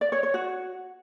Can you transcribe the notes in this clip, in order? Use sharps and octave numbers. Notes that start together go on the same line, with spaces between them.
D5
C#5
C#5
F#4